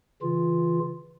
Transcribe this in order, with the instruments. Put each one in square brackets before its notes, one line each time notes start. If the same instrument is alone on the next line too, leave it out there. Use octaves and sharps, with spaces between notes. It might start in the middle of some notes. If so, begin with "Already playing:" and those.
[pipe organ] C#3 E3 F4